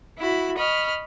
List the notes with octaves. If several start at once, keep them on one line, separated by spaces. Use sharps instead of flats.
E4 F#4 B5
D#5 B5 C#6 F6